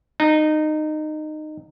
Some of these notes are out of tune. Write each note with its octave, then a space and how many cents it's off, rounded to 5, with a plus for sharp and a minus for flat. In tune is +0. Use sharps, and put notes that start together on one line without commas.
D#4 -20